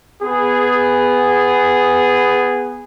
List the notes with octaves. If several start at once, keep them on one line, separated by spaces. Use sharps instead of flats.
B3 G#4